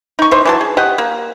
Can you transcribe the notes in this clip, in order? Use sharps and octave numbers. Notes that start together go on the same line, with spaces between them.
D#4 C#6
E3 C5 D#5
E3 F#3 A5
G#4
G4 D#5 F#5
A#3